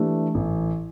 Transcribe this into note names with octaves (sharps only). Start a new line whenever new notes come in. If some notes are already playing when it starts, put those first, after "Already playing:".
Already playing: E3 A3 D4 G4
A1